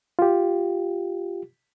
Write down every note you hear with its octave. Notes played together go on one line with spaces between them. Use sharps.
F4 G4